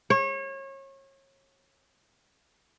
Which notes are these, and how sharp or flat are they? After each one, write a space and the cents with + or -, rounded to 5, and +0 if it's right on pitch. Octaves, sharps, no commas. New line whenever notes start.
C#5 -30